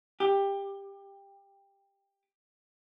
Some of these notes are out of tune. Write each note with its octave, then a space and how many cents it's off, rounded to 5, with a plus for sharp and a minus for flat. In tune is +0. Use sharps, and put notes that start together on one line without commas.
G4 +15